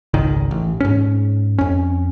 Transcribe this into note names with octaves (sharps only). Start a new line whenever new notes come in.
G#1 C#2 D#3
A1
G#2 C#4
F2 C#4